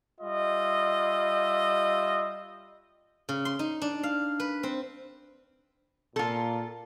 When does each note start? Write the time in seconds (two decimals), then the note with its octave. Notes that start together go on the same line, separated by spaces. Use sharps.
0.21 G3 F4 D#5 E5
3.29 C#3
3.45 C6
3.59 D#4
3.82 D4
4.03 F5
4.40 B4
4.63 C4
6.16 A#2 F4 A4